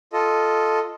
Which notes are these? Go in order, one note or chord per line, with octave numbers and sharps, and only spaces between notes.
F4 A4 D#5